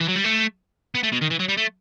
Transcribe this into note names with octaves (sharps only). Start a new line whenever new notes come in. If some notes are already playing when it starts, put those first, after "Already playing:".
E3
F#3
G3
A3
B3
A3
B2
D#3
E3
F#3
G3
A3